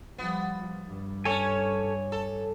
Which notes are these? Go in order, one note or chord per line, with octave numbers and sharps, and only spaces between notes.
F3 G3 B3
G2
C#4 A4 C#5 G#5
A4